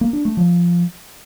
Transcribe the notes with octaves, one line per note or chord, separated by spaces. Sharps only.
A#3
D4
A3
F3